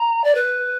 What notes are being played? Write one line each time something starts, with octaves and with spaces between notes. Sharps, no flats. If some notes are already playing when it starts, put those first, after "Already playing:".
Already playing: A#5
D5
B4